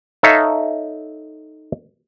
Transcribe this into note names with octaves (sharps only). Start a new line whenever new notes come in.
D#4 A4 C#5 E5 F5